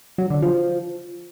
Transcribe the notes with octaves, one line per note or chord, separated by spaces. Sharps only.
F#3
D3
F3